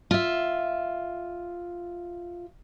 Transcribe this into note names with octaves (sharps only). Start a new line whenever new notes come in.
F4 E5